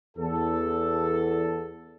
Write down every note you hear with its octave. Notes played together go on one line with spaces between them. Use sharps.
E2 A4